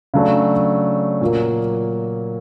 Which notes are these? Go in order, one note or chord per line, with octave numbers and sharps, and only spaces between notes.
C#3 F#3 A3 D4
A#2 F#3 A#3